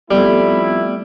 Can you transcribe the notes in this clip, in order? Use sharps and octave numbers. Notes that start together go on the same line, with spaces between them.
F2 G3 A3 B3 E4